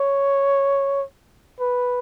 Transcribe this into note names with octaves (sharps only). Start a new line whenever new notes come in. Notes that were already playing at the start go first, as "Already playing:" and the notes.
Already playing: C#5
B4